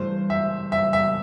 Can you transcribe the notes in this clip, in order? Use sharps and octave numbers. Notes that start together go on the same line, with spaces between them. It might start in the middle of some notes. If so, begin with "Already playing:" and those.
Already playing: G2 E3 A3 C5
E5
E5
E5